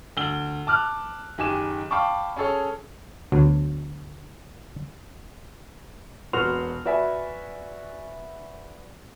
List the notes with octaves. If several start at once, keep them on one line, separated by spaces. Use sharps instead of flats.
D2 E6 G7
A5 D6 F6 F#6
F#1 D#3 G4 G#5 D6 E7
F5 G5 A5 B5 C#6 D6
C#4 G#4 A4 C#5
D2 F#3 B3
E1 B3 F#4 C6 F6 F7
F#4 B4 D5 E5 G#5